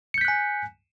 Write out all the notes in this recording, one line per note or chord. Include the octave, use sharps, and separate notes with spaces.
G#5 F#6 G6 B6 C#7